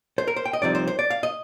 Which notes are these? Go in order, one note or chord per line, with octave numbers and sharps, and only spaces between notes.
C5
A#4
C5
G5
D#5
C2 C3 F3 C4 D#4 D5
C5
C5
D5
F5
D#5